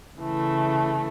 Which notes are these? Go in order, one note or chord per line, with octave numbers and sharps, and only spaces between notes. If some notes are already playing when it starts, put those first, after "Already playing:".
C#3 E3 A3